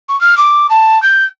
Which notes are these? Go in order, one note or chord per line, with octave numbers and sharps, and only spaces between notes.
C#6
F6
D6
A5
G6